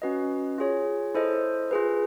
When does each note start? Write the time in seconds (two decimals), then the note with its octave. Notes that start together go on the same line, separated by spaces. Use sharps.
0.02 C#4 F#4 B4 D#5
0.58 F4 G#4 C#5
1.15 E4 A4 C5 D#5
1.71 F4 G#4 B4